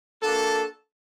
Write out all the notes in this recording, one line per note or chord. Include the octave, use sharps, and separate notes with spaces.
A#3 D4 F#4 A4